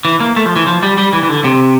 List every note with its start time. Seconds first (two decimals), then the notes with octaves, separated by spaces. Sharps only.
0.05 E3
0.20 A#3
0.36 A3
0.46 F3
0.56 E3
0.67 F3
0.83 G3
0.98 G3
1.13 E3
1.23 E3
1.29 D3
1.44 C3